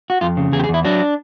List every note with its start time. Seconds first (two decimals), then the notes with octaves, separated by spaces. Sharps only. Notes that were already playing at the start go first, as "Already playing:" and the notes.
0.10 F#4
0.21 F2 F4
0.37 C#3
0.52 E2 G#4
0.60 G4
0.64 G#4
0.69 E2 E4
0.85 F#3 D4